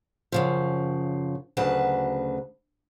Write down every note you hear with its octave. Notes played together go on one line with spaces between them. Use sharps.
F#2 C#3 F3
D2 C#3 F#3 B4 A5